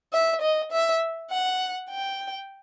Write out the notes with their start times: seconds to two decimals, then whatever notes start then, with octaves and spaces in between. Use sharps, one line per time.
0.13 E5
0.42 D#5
0.72 E5
1.31 F#5
1.90 G5